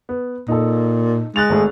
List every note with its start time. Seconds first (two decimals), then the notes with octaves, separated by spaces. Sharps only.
0.09 B3
0.48 A#2 D#4 A4
1.36 G#3 F#6 A6 F7
1.49 G#1 A3 G#4